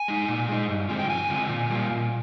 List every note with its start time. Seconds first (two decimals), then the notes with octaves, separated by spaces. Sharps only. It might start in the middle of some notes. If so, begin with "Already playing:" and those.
Already playing: G#5
0.08 G#3 D#4
0.28 A#2
0.49 G#3 D#4
0.69 G2
0.89 D3 G#3 C4 F4
0.99 G5
1.09 G2 G#5
1.30 D3 G#3 C4 F4
1.49 A#2
1.70 G3 A#3 F4
1.90 A#2